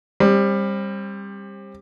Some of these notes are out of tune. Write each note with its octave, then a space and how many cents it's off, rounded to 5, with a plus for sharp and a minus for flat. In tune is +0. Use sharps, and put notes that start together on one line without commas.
G3 +20 C4 +35